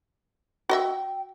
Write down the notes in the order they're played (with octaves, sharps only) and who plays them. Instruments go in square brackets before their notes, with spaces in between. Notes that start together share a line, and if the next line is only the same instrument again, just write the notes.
[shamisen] F#4 D#5 E5 [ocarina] G5